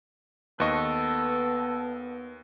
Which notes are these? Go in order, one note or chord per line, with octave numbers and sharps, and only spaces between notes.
D#2 B3 A4 B4 D#5 C#6